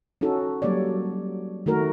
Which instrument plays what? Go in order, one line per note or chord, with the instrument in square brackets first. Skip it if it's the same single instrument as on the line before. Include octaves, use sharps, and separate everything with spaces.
[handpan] C#4 D#4 F#4 A4
F#3 G3 A#3 C#5 D5
D#3 A3 F#4 A#4